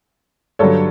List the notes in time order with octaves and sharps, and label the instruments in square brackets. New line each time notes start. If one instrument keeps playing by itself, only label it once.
[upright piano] G2 D3 F#3 A4 C#5